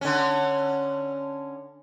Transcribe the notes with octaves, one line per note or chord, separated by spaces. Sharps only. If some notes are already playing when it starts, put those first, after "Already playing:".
D3 C#4